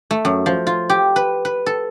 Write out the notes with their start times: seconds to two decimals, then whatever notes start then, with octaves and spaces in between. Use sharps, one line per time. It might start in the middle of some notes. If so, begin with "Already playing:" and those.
0.11 A3
0.25 F#2
0.46 F3
0.67 F4
0.90 G4
1.16 B4
1.45 B4
1.66 A4